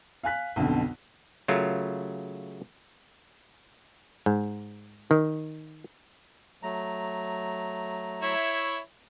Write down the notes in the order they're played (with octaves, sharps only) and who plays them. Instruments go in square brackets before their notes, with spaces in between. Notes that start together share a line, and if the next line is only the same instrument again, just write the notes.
[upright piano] F5 G#5 F#6 B6
B1 F2 B2 D3
[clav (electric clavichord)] C#3 F#3 A3 F4 A#4
G#2
D#3
[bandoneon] F#3 A3 A#5
[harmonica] E4 C#5 E5